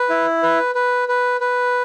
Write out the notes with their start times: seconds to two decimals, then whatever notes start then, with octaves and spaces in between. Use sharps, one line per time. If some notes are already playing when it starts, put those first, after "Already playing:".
Already playing: B4
0.09 E4
0.43 B4
0.75 B4
1.08 B4
1.41 B4